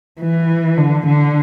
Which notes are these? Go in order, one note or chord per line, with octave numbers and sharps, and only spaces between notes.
E3
D3
D3